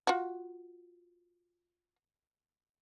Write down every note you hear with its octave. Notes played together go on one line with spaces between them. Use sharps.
F4 F#4